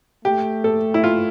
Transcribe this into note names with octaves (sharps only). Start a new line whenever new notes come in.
A3 G4
A4
E4
F4